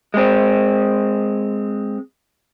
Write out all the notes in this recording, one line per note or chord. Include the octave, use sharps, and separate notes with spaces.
G#3 C4